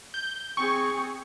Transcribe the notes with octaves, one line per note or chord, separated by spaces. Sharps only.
G6
C4 G#4 C#6